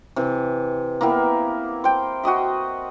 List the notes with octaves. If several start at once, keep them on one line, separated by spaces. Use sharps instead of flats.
C3 E3
A#3 B3 E4 G4
C5 G5
F#4 G4 D#5 E5